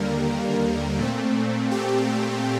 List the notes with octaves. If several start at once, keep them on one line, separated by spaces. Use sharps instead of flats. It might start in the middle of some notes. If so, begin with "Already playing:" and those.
Already playing: D#2 D3 G3 A#3 A#4
A#2 A3 C4
G4